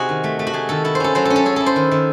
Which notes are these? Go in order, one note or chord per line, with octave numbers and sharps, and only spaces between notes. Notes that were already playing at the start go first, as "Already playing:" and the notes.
Already playing: C3 D#4 F#4 G#4
D#3
A3
A3
F#4
A3 G#4
D#3 A4
E4 A4
C5
C#4 A4
F#3 C5
A4
C#4
A4
C#4 G#4
E4 A4
C5
D#3
D#3